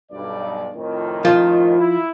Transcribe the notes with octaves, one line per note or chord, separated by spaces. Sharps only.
B1 G2 D5
F2 A2 D#3
F3 F4
E4